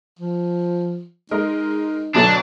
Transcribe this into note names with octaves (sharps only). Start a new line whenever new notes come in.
F3
G#3 D#4 A#4 D#5
D2 B2 F#3 D4